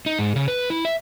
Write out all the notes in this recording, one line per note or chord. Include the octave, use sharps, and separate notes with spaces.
D#4
G#2
C#3
B4
E4
E5